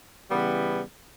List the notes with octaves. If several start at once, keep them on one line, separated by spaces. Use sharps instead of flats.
C#3 E3 G3 B3